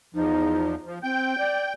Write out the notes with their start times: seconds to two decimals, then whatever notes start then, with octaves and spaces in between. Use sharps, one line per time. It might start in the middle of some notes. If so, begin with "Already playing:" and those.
0.15 E2 F3 D#4
0.86 F3
1.03 C4 G5 G6
1.38 D5